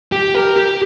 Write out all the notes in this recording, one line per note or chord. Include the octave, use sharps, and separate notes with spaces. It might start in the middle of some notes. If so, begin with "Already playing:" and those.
G4
A#4
G4